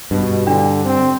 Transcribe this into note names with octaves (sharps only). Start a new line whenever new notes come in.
G2 B2
D3 D4
C4